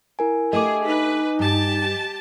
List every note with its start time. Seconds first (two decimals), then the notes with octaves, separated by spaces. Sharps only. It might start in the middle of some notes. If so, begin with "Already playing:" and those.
0.19 E4 A#4 G#5
0.53 A3 D4 G4 G#4 D#5 G#5 D6
0.86 D#4 B4
1.39 G2 G4 A5